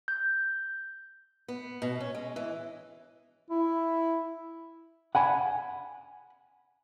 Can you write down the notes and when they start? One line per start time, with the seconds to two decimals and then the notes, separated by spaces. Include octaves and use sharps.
0.08 G6
1.48 B3
1.82 B2
2.00 C#4
2.15 G#3
2.36 E3
3.50 E4
5.15 F#5 G#5 B5